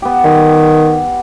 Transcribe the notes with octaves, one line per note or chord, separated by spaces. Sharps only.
B3 G4
D#3